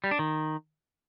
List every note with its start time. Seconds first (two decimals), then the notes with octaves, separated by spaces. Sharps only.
0.04 G3
0.11 D4
0.19 D#3